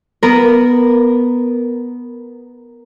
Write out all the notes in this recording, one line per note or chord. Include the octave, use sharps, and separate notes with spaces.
B3 A#4